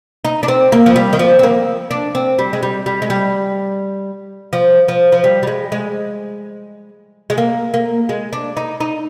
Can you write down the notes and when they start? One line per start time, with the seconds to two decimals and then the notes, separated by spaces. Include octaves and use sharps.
0.25 D#4
0.43 D4
0.48 C4
0.72 A#3
0.86 F3
0.96 G3
1.13 D#3
1.19 F3
1.39 C4
1.43 A#3
1.91 D4
2.15 C4
2.39 G3
2.53 G#3
2.63 G3
2.86 G3
3.02 G#3
3.10 G3
4.53 F3
4.88 F3
5.12 F3
5.24 G3
5.43 G3
5.47 G#3
5.72 G#3
7.30 G#3
7.38 A#3
7.74 A#3
8.09 G#3
8.33 D4
8.57 D#4
8.80 D#4